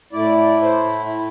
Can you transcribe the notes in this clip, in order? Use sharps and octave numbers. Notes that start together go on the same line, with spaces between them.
A2 A3 E4 D5
D5
C5
E4